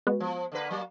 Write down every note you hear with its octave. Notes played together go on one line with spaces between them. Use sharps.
G#3 B3 F#4
F3
D3 A#3 B4
F#3 A#3